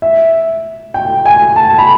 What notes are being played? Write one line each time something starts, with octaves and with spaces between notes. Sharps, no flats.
E5
G5
G#5
A5
B5